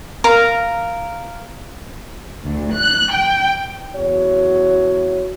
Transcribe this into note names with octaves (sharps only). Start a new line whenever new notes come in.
A#4 F5 A#5
D2
F#6
G5
E2 F#4 C#5